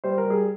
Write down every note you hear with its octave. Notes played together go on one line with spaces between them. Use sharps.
G3 C5
A#4
G3
G#4